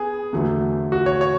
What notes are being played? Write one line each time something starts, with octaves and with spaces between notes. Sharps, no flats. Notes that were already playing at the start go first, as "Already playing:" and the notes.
Already playing: B3 G#4
E2 D3 F#3 A3
F#4
C#5
C#5